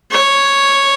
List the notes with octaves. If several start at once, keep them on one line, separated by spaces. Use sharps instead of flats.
C#5